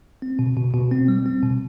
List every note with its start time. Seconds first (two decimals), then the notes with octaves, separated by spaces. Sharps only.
0.22 C4
0.39 B2
0.57 B2
0.73 B2
0.91 C4
1.08 G3
1.26 C4
1.42 B2